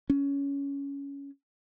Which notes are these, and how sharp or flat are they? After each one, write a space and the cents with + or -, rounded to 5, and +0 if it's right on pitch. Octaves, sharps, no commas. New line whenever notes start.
C#4 +15